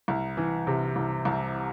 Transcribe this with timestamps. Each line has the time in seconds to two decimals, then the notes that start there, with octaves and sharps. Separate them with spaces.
0.08 C2
0.37 E3
0.67 C3
0.96 C2
1.25 C2